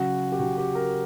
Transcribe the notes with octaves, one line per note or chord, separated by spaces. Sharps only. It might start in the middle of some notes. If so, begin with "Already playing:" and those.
Already playing: C#3 F#3 F#4
G4
C#3 F#3 F#4
G4
A#4